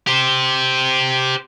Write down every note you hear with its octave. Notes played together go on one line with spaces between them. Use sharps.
G4 C5